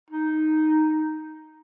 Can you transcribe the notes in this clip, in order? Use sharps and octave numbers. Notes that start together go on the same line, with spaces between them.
D#4